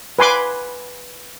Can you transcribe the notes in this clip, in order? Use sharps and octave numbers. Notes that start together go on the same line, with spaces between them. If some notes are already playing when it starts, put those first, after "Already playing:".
B4 G#5 C6 D6